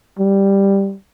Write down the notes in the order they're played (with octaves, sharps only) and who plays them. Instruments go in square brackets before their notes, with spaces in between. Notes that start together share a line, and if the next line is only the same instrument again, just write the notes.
[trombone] G3